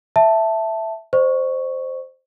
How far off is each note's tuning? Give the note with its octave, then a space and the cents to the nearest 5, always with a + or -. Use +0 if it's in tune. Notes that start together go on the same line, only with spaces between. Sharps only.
E5 +0 A5 +0
C5 +0 D#5 -45 C#6 +0